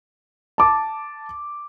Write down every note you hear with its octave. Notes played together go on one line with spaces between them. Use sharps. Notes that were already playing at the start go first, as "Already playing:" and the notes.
A5 D6